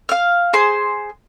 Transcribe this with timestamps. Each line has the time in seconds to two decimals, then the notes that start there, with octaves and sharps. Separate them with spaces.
0.09 F5 F6
0.53 G#4 C5 C6